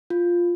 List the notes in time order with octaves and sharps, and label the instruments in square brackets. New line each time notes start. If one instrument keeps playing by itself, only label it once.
[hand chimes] F4